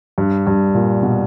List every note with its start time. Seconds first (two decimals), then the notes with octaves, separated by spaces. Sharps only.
0.18 G2
0.47 G2
0.75 A#2
1.03 B2